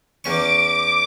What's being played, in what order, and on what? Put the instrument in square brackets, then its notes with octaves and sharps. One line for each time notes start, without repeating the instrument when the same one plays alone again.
[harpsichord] E2 C#4 C#6 [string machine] D6